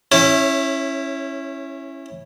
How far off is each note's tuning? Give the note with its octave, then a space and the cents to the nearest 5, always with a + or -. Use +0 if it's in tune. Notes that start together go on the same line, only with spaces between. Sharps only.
C#4 -20 E4 +0 C#5 +5